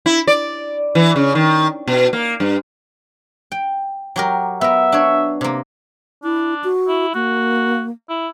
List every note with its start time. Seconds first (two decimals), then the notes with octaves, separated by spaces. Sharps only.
0.06 E4
0.27 D5
0.95 E3
1.16 C#3
1.35 D#3
1.88 B2
2.13 A#3
2.40 G2
3.52 G5
4.16 F#3 G4 A#4
4.61 B3 A#4 E5
4.92 D4 C#5
5.41 C3 A#3
6.24 D4 E4
6.64 F#4
6.88 E4
7.14 A#3 F#4
8.09 E4